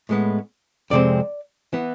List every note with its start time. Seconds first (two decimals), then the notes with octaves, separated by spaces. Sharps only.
0.09 A2 G#3 B3
0.90 F2 C3 G#3 C4 D5
1.73 E3 B3